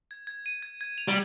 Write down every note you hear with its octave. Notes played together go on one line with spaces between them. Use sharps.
G#6
G#6
D#7
G#6
G#6
F7
G3